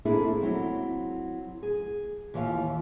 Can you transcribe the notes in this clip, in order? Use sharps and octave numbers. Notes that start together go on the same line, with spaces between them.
A#3 C4 D4 E4 G#4 A4
F#3 C4 E4
G#4
D#2 E3 F4 C5 F5